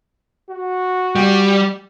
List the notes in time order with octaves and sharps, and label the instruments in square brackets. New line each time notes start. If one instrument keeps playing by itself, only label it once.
[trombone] F#4
[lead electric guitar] G3